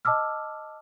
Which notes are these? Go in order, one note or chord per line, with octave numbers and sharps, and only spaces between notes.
D#5 A5 D6 E6 F6